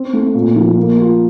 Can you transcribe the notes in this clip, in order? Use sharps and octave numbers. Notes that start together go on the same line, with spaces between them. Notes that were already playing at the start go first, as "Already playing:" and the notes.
Already playing: C4
A3
A#2
F3
A#3
F4